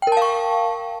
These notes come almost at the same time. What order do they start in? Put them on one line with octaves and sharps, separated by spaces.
G5 A#4 A5 F5 C#6